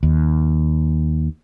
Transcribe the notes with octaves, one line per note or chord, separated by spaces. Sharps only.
D#2